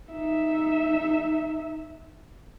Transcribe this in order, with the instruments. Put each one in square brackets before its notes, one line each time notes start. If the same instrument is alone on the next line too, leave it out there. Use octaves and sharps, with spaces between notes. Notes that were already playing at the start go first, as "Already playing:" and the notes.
[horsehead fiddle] D#4 E5